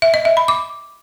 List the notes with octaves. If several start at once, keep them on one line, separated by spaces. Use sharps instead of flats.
E5
D#5
E5
B5
D6